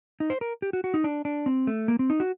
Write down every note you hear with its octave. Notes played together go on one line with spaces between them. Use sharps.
D#4
C5
A#4
G4
F#4
F#4
D#4
D4
D4
C4
A3
A#3
C4
D#4
F#4